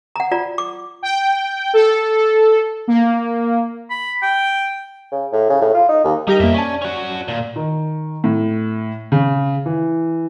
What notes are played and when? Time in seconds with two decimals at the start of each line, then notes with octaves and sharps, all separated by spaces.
0.16 F#5 A#5
0.31 F4 D5 A#5
0.58 D6
1.03 G5
1.74 A4
2.88 A#3
3.90 B5
4.22 G5
5.11 C#3
5.32 A2
5.49 C#3
5.61 A2
5.74 F4
5.89 D#4
6.04 D#2
6.27 G3 D#4 G4 A#4
6.40 F2 B2 A#3 E5
6.54 C#4 D5 A5
6.82 C#4 F#4
7.28 A#2
7.56 D#3
8.24 A2
9.12 C#3
9.66 E3